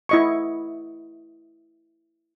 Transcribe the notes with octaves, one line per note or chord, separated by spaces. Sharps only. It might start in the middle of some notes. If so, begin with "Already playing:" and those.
E4 D#5 C#6